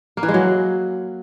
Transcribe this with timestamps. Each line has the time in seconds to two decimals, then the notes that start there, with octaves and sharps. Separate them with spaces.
0.17 A#3
0.23 E3
0.29 G#3
0.34 F#3